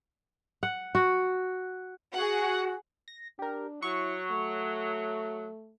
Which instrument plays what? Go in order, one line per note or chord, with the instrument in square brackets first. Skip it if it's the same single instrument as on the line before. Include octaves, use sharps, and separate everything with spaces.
[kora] F#5
F#4
[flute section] F#4 [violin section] G#4 F#5
[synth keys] A#6
[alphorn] D4 [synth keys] G4 A#4
[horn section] F#3 [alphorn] E4 [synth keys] C#6
[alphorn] A3